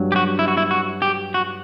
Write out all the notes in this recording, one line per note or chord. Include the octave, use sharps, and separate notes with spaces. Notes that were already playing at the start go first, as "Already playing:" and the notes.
Already playing: G2 F#3
G4
F#4
E4
F#4
E4
F#4
G4
F#4